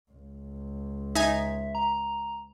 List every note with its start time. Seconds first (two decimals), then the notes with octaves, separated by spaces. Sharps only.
0.11 C#2
1.15 D#4 E5 G#5
1.75 A#5